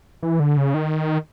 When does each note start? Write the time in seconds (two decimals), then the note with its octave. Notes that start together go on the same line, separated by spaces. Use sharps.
0.23 E3
0.40 D3
0.57 C#3
0.74 D#3